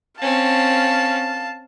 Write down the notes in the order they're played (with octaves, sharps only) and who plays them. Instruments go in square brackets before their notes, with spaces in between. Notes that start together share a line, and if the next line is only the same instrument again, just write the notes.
[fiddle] C4 C#4 [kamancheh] F5 A5